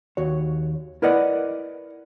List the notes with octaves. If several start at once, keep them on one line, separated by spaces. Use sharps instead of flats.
D#2 F#4 C#5
E4 A#4 B4 D5 D#5 F#5